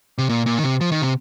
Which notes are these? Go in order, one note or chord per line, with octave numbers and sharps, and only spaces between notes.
C3
A#2
A#2
D#3
C3
F3
D#3
C3